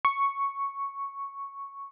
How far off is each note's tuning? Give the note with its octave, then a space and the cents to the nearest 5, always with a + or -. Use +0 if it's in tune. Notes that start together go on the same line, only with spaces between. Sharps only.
C#6 +0